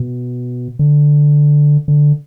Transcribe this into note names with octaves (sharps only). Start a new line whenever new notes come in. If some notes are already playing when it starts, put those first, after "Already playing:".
Already playing: B2
D3
D3